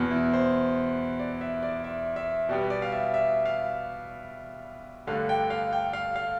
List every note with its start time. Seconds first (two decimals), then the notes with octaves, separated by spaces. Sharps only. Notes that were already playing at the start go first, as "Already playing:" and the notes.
Already playing: E2 B2 B3
0.11 E4
0.33 C5
1.19 D5
1.41 E5
1.63 D5
1.84 E5
2.16 E5
2.49 B2 G3 B3 D5
2.70 D5
2.82 F5
2.92 E5
3.14 E5
3.46 F5
5.07 G2 D3 A3 F5
5.29 G5
5.50 F5
5.73 G5
5.93 F5
6.16 F5